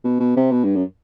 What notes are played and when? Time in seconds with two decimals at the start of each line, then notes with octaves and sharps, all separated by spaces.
0.04 B2
0.20 B2
0.36 C3
0.51 B2
0.64 G2
0.75 F#2